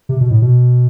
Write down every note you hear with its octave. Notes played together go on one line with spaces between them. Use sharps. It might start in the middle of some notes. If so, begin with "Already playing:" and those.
C3
B2
A2
B2